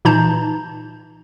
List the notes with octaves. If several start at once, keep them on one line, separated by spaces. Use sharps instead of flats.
A#2 E3 D#4 A5 A#5 G6